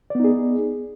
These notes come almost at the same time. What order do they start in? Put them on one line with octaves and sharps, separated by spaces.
D5 B3 D#4 G#4